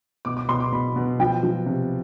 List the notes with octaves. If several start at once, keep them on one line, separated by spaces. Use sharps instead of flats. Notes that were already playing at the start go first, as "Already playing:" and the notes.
B2 D6
D6
B2 C6
D6
B2 B5
B2
F3 G5
F3
C3